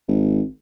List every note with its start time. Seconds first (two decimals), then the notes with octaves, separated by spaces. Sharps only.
0.08 G#1